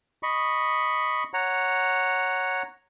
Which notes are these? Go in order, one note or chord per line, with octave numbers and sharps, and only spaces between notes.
D#5 B5 C#6
C#5 F#5 A#5